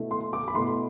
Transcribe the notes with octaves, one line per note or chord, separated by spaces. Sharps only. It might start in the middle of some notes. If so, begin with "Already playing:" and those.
Already playing: B2 A3 E4
C6
D6
B5
B2 A3 E4 C6